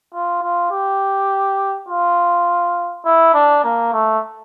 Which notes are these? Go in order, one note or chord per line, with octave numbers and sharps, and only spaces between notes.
F4
F4
G4
F4
E4
D4
A#3
A3